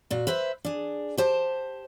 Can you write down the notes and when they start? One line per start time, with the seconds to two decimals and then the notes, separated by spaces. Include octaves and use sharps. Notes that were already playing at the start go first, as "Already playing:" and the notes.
0.11 A#2 F#4
0.27 B4 C5 E5
0.65 D4 G#4
1.18 G4 C5 A5